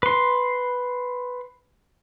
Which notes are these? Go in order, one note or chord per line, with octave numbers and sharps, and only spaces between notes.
B4 C6